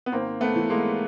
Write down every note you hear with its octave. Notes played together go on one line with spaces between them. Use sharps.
B3
G#1 A#3 C4
A3 B3
E3
G#3 A#3